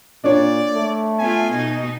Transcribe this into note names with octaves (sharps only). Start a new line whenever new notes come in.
A#2 D4 C#5 D5
A3
B3 F4 G#5
B2 D#4